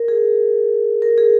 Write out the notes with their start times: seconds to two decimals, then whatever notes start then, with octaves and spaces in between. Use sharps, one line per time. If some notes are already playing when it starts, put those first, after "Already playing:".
Already playing: A#4
0.08 G#4
1.02 A#4
1.18 G#4